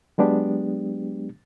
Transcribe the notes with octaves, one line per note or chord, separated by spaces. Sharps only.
F#3 G#3 B3 D4 G4